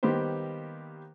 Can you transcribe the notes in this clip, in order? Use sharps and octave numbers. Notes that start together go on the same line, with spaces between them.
D#3 G3 A#3 B3 G4 C5